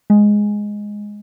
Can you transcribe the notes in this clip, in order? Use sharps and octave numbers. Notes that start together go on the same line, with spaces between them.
G#3